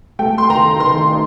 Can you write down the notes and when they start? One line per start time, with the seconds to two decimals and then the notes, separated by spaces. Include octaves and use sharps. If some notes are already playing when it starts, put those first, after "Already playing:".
0.19 A3 G5
0.38 C6
0.49 D#3 A#5
0.80 D#3 C6
1.11 D#4